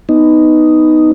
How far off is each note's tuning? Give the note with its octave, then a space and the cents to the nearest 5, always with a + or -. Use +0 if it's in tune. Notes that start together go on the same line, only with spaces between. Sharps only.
B3 +10 D#4 +0